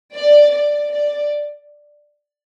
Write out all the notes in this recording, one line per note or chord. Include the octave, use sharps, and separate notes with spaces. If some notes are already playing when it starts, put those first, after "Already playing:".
D5
D5
D5